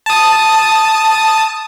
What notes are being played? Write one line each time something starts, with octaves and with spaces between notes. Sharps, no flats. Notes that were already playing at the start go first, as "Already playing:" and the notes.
A5 D#6